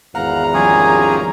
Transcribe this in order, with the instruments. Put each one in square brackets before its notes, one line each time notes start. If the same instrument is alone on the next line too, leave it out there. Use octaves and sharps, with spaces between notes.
[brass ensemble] G#1 E2 [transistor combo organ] F5 F#5 [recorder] A#5
[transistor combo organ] F3 G3 C#4 [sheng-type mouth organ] G#4